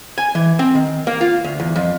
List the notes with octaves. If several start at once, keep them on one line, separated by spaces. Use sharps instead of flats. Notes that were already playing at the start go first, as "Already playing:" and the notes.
G#5
E3
C4
D#3
A#3
F4
D2
E2
F2